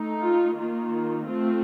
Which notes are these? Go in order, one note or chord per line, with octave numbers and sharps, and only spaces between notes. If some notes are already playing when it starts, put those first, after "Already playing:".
Already playing: A3 D#4
F4
D#3 A#3 F4
A3 C4 F4